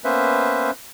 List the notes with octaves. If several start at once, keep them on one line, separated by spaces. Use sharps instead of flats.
A#3 B3 C#4 B4 C5 E5